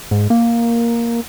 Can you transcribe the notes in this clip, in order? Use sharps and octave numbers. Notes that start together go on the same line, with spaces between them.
G#2
A#3